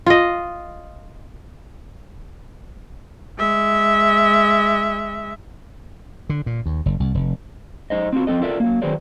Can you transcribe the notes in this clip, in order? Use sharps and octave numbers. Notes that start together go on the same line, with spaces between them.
F4 D#5
G#3 E5
D3
A#2
D#2
F#1
C2
F1
F#2 D#4 C5 D#5
C4 D#4 F4 F#4
F3 G3 C4 A4 D#5
F4 A4 A#4 D5 E5
F#3 A#3
D#3 F#3 G#4 B4 C5 D5